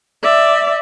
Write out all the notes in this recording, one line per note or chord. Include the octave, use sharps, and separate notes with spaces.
D5 E5